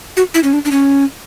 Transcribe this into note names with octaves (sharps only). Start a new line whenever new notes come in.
F#4
E4
C#4
D4
D4
C#4